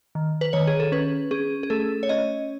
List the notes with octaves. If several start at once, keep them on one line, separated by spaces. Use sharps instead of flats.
D#3
B4
D#3 C#5
G#4
A4
C#4 B4
C#4 G#4
G#4
A3 A4
C#5
C#4 D#5